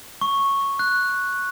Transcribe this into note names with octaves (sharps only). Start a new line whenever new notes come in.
C#6
F#6